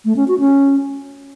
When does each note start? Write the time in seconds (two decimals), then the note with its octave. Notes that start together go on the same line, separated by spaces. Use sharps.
0.05 A3
0.16 C#4
0.28 F#4
0.39 C#4